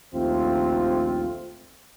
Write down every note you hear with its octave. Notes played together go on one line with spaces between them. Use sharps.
A#1 D#2 A3 C4 F4